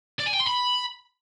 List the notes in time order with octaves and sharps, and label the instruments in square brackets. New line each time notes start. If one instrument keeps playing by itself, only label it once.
[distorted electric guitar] D5
G#5
G5
C6
B5